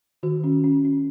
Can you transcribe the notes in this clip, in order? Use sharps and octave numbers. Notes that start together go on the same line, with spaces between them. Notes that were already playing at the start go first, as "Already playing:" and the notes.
D#3 F#4
C#4
C#4
C#4